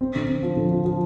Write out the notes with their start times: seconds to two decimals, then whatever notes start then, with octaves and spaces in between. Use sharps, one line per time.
0.01 C4
0.16 D3
0.28 C4
0.43 F3
0.57 D3
0.71 F3
0.85 F3